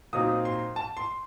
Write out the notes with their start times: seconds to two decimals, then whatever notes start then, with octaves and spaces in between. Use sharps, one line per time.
0.13 A#2 F#3 C4 D#4 D#6
0.45 C6
0.76 A5
0.97 C6